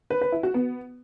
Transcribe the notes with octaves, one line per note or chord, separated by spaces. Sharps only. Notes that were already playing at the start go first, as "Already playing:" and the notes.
B4
B4
E4
F#4
B3